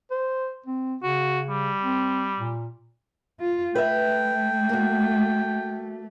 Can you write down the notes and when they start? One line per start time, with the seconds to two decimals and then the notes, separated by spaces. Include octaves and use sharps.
0.11 C5
0.67 C4
1.03 C#3 F#4
1.49 G3
1.82 C4
2.39 A#2
3.40 F4
3.75 A3 B4 E5 G5
4.69 A#3 F#4